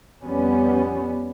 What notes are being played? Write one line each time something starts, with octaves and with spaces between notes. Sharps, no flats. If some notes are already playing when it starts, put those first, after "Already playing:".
F2 G3 B3 C#4